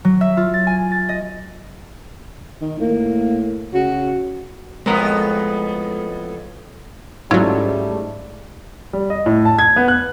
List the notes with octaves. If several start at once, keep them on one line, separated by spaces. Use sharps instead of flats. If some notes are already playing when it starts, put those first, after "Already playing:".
F#3
E5
F4
A6
G#5
A6
D#5
D#3
A2 A#3
C#3 F#4
F2 A2 G#3 B3 A#4
G#2 F#3 G3 A3 C#4 E4 F4
G3
D#5
A2
A5
G#6
B3
F#6